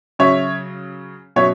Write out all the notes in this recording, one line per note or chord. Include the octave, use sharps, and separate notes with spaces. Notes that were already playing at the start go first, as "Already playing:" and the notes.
C#3 F#3 C#4 C#5 E5
B2 F#3 C#4 C#5 E5